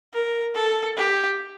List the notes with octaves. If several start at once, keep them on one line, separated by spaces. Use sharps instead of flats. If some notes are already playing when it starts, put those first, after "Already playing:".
A#4
A4
G4